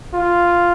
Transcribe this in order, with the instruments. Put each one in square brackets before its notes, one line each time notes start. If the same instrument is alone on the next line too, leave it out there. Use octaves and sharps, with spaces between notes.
[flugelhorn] F4